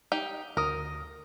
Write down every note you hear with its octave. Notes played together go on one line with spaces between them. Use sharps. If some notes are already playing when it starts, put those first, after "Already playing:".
D#4 G4
D2 A#4 D#6